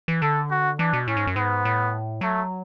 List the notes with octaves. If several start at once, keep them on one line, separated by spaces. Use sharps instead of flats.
E3
D3 A4
F#4
E3 D4
B2
A2 C#4
G#2
F#2
G#2 B3
A2
F#3 A3